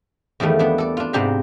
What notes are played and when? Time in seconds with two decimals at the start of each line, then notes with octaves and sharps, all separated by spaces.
0.40 E2 D#3 F3 G3 A3
0.59 B3 D4
0.78 A4 D5
0.97 D4 F4
1.13 G#2 C3 D4 G4 A#5 B5